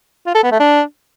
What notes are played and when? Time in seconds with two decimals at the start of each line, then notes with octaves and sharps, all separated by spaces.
0.26 F4
0.35 A4
0.43 B3
0.51 A3
0.60 D4